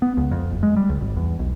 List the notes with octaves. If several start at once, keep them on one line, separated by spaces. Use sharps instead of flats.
B3
C#2
F2
F#1
G#3
G3
C#2
G#1
E2
B1